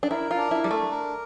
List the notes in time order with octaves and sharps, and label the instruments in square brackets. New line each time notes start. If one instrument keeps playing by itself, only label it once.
[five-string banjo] D4
[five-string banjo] E4 [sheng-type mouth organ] A#4
[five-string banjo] F4
[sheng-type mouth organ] D4
[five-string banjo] E4
[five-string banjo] G3 [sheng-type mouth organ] D4
[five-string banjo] A3
[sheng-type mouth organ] A#4